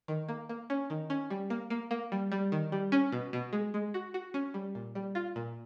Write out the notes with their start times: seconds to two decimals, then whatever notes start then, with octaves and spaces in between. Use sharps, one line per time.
0.08 D#3
0.29 A#3
0.49 A#3
0.70 C#4
0.90 D#3
1.10 C#4
1.30 G3
1.50 A#3
1.70 A#3
1.91 A#3
2.12 G3
2.32 G3
2.52 D#3
2.72 G3
2.92 C#4
3.12 B2
3.33 B2
3.53 G#3
3.74 G#3
3.94 F#4
4.14 F#4
4.34 C#4
4.54 G3
4.75 A#2
4.95 G3
5.15 F4
5.36 A#2